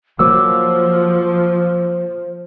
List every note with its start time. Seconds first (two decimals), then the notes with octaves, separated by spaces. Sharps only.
0.19 F3 F#3 A#3 C5 D6 E6